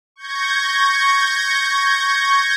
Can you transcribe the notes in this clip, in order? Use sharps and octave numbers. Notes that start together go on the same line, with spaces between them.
C#6 G6 G#6 A#6